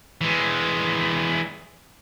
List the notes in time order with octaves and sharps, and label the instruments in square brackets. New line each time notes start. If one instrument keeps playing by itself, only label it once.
[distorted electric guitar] E3 G#3